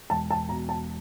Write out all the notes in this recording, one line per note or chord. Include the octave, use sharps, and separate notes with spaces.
E1 A5
A5
B2 A#5
A5